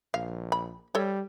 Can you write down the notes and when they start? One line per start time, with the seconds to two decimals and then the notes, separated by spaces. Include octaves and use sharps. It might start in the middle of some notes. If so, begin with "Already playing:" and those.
0.14 A#1 F5
0.52 B5
0.95 G3 A4 C#5